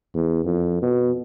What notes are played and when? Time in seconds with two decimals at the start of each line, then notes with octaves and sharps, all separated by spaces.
0.14 E2
0.44 F2
0.82 B2